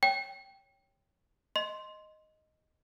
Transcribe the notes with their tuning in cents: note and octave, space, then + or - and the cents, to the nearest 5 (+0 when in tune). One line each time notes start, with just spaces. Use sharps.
C#5 +0 G5 +0
D#5 +0 C6 +0